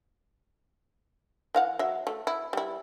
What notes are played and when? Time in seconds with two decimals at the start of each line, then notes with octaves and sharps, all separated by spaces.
1.55 E3 F5 F#5
1.79 F#3 E5
2.07 A3
2.27 E4
2.53 G3 E4